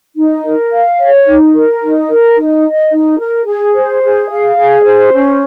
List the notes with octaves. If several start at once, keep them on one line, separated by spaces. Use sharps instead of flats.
D#4
A#4
F5
C#5
D#4
A#4
D#4
A#4
D#4
D#5
D#4
A#4
G#4
C5
G#4
F5
G#4
C5
C#4